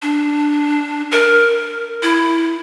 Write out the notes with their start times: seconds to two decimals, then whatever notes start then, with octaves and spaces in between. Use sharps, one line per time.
0.02 D4
1.11 A#4
2.03 E4